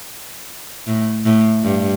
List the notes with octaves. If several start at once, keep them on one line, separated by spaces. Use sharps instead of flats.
A2
A2
G2